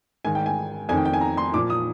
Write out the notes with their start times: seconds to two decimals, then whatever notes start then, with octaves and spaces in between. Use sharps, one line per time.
0.25 G#2 D#3 G#5
0.35 G5
0.46 G#5
0.89 F2 G#5
0.93 D#3 G5
1.05 G5
1.14 G#5
1.21 A#5
1.37 C6
1.54 A#2 F3 D6
1.70 D#6